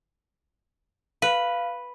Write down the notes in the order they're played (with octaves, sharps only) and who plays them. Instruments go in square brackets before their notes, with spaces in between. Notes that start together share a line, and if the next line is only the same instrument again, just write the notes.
[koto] B4 [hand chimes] F5